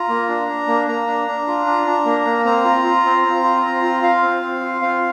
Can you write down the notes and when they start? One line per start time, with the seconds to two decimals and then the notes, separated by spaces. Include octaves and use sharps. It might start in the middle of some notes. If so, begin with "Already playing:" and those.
Already playing: F4 A#5
0.09 A#3
0.28 D4
0.48 D4
0.67 A#3
0.88 A#3 A#5
1.07 D4
1.27 D4
1.47 F4
1.66 D4
1.86 D4
2.05 A#3
2.26 A#3
2.45 C4 A#5
2.65 F4
2.85 F4
3.05 C4
3.25 C4
3.44 F4
3.63 C4
3.84 F4
4.03 F4 F5
4.23 C4
4.42 C4
4.63 F4
4.82 C4 F5